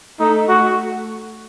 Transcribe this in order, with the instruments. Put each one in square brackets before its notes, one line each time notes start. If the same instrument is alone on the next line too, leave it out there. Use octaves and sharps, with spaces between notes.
[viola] A3 [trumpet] D#4
[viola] A3 [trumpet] F#4